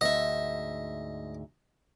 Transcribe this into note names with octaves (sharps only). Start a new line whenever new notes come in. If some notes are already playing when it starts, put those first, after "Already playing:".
D2 G#2 D#5 E5